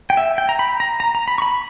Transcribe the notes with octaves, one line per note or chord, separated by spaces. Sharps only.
G5
E5
G5
A#5
B5
A#5
A#5
A#5
B5
C#6
B5